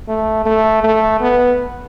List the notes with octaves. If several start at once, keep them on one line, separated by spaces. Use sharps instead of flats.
A3
A3
A3
B3